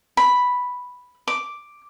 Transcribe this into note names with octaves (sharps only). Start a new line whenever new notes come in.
B5
D6